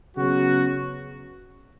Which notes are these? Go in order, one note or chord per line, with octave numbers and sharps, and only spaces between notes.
C#3 F#3 B3 F#4